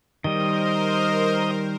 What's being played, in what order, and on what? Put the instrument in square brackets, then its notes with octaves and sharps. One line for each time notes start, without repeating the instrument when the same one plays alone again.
[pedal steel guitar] D#3 G3 [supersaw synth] A#4 C5 [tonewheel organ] D#5